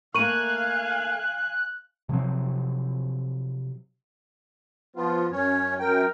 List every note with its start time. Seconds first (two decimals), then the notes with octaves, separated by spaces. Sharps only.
0.14 A3 A#3 A#4 F5 G#5 C#6 F#6 D#7
2.09 C3 F3 F#3 C4
4.96 F3 B3 F4
5.32 F#2 C#4 C#5
5.80 F#2 A#4 G5